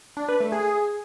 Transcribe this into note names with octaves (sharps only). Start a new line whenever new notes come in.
D4
B4
A3
G#4